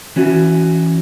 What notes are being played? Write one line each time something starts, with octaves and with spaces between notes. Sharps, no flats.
E3 C#4 F#4